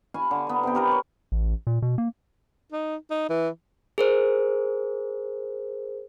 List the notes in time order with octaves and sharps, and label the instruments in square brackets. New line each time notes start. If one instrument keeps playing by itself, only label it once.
[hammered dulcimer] F5 G#5 B5 C#6
D3
B3 A#5
C3 B3 G5
G4 A#4 B4
A#4 C#5
[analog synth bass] A1
A#2
B2
A#3
[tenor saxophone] D#4
D#4
E3
[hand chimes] G#4 A#4 C5